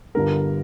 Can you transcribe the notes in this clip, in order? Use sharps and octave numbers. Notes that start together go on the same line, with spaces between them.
G1 G2 D3 G3 A#4